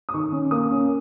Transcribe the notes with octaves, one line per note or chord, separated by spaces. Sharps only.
D#6
D#3 C#6
C#4
A#3 D#6
C#4